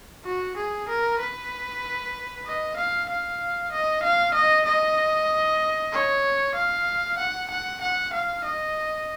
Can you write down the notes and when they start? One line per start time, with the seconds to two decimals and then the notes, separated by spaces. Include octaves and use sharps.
0.25 F#4
0.57 G#4
0.88 A#4
1.20 B4
2.46 D#5
2.77 F5
3.09 F5
3.72 D#5
4.03 F5
4.34 D#5
4.66 D#5
5.93 C#5
6.55 F5
7.18 F#5
7.50 F#5
7.81 F#5
8.13 F5
8.44 D#5